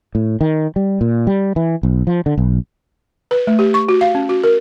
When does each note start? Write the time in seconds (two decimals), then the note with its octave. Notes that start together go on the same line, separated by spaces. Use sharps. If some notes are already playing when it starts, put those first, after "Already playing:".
0.15 A2
0.41 D#3
0.76 G3
1.01 A#2
1.27 G3
1.56 E3
1.83 B1
2.07 F3
2.26 D3
2.38 B1
3.31 B4
3.47 A3
3.59 G4
3.74 C#6
3.89 F#4
4.01 F5
4.15 C#4
4.29 F#4
4.44 A#4